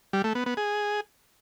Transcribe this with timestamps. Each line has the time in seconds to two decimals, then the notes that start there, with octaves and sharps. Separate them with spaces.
0.13 G3
0.24 A3
0.35 B3
0.46 B3
0.57 G#4